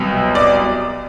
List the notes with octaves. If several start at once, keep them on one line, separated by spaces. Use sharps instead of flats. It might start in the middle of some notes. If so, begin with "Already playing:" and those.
Already playing: C2 B2 F#3
D5